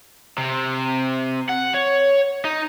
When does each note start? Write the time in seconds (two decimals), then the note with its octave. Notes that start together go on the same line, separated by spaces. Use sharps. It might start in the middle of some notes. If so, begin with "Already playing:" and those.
0.38 C3
1.49 F#5
1.74 C#5
2.45 D#4